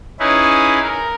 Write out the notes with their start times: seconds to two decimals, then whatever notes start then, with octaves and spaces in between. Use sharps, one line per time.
0.20 C#4 D#4 E4 G#4 B4
0.83 A#4